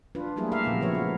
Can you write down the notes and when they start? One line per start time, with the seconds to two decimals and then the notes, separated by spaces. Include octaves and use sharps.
0.15 D4 F4 B4
0.36 F#3 G3 A3 A#3 E4 G#4
0.52 G4 A#4 E5 F5
0.64 A#2 C#3 F3 B3 G#4 A#4
0.81 C#3 F3 B3 E4 C#5 E5
0.95 A3 F#4